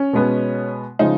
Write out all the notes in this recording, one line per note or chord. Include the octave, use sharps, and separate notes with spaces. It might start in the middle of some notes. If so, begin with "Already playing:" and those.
Already playing: C#4
B2 G#3 B3
C#3 F3 G#3 D#4